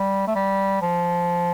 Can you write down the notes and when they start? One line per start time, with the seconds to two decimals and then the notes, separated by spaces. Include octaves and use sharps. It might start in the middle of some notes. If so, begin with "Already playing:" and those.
Already playing: G3
0.28 A3
0.36 G3
0.82 F3